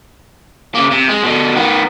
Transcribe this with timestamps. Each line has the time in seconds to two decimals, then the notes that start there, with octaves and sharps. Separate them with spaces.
0.75 C#3 A#3
0.92 C3
1.09 G#3
1.24 B2 D3
1.55 D#3 B3